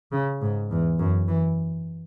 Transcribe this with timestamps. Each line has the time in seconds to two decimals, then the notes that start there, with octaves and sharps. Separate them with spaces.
0.12 C#3
0.42 G#2
0.71 E2
0.99 F#2
1.28 E3